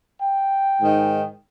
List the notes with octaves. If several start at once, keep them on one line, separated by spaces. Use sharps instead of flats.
G5
G#2 D#3